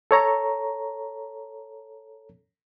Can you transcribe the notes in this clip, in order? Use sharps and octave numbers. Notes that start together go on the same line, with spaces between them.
A4 C#5 A#5